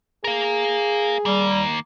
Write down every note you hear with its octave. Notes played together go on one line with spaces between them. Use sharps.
G#4 A#4 F5
D#3 G3 A#3